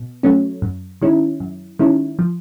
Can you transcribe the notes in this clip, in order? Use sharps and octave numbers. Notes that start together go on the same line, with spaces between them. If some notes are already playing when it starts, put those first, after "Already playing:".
Already playing: B2
F#3 A3 C#4
F#2
D#3 G#3 C#4 E4
F#2
D#3 G#3 C#4 E4
F3